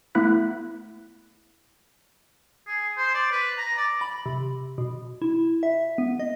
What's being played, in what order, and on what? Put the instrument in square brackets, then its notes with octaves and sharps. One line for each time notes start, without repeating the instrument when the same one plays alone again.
[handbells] A3 B3 E4 F#6 B6
[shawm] G#4
C5
D5
B4
A#5
D5
[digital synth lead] B5
C3
B2
E4
E5
B3
D#5